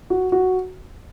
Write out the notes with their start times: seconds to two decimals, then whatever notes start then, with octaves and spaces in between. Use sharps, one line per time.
0.10 F#4
0.32 F#4